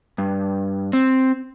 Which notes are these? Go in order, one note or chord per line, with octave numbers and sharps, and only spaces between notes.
G2
C4